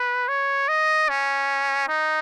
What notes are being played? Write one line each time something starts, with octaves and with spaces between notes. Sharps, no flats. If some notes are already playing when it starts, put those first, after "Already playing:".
Already playing: B4
C#5
D#5
C#4
D#4